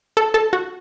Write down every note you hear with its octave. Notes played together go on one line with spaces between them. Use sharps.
A4
A4
F#4